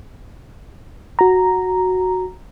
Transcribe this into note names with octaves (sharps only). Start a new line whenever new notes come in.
F#4 A#5